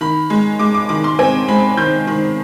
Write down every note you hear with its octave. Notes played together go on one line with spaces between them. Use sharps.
D#3 B5
G#3
G#3 D6
D6
D#3 D6
C6
C4 G#5
G#3 B5
D#3 G6
D#3